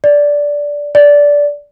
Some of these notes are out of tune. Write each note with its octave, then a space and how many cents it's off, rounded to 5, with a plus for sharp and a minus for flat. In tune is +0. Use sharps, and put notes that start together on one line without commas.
D5 -10
D5 -15